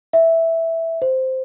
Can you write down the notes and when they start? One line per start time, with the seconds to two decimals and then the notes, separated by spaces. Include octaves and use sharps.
0.13 E5
1.02 C5